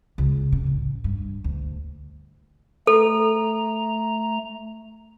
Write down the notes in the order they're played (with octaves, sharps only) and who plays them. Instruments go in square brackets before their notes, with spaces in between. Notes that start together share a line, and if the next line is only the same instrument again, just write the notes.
[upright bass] C#2
C#3
A1
G2
D2
[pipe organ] A3 A#5 [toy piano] A4